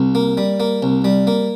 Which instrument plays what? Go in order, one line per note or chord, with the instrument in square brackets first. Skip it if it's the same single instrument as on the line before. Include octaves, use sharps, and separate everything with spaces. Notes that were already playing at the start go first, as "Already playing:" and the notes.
Already playing: [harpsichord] C2
A#3
G3
A#3
C2
G3
A#3